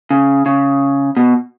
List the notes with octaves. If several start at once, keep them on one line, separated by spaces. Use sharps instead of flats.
C#3
C#3
B2